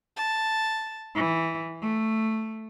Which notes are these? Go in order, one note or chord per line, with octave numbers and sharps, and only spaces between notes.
A5
E3
A3